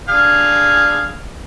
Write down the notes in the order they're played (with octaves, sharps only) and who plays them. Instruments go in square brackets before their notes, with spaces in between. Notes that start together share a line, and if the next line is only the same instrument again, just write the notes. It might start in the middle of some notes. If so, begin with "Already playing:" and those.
[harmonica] D3 G#4 F5